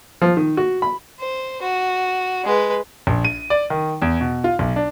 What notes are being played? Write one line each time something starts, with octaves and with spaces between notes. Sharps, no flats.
F3
D#3
F#4
B5
C5
F#4
G#3 B4
A#1
D#7
D5
D#3
E2
B2
F4
B1
D4